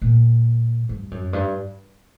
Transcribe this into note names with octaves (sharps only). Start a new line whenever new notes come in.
A#2
G2
F#2
G2